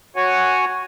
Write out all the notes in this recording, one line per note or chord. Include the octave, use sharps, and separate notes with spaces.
F#4 C#5 F#5 G#5